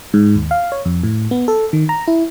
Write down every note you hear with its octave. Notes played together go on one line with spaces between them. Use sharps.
G#2
D#2
F5
C#5
F2
A2
B3
A4
D#3
A#5
E4